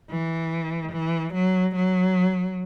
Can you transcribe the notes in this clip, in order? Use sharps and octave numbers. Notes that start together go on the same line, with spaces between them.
E3
E3
F#3
F#3